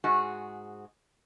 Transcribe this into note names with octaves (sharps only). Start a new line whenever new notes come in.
G#2 F#4 G#4